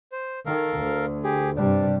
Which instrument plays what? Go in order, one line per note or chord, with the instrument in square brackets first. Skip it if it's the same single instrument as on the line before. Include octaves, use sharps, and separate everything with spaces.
[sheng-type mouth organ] C5
[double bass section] D#3 [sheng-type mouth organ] A4 A#4 F5
[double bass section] D2
[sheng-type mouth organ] G4 G#4
[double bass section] G2 C3 G3 [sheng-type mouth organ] D4